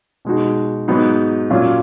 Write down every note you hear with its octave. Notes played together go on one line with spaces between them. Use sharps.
B2 G#3 D#4 F#4
G#2 F#3 B3 D#4
A#2 F#3 C#4 F4